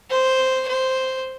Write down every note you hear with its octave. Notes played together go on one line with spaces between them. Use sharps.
C5
C5